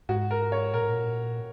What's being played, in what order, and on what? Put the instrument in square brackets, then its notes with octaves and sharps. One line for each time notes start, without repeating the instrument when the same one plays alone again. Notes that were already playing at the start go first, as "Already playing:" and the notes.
[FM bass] G#2 [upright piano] F#4
[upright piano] A#4
C#5
[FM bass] A#2 [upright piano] A#4
[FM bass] G#2
A#2